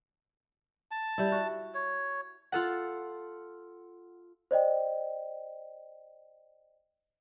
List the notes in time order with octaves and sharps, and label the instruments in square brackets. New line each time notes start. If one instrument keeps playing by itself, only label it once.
[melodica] A5
[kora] G3 E4
F#4
[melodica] C#5
[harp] F4 A4 F#5
[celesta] C5 D5 D#5 G5